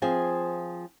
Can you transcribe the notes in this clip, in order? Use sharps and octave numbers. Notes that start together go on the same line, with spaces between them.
F3 C4 F4 G#4